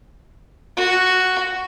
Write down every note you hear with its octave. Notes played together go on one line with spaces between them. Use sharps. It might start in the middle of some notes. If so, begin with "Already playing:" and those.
F#4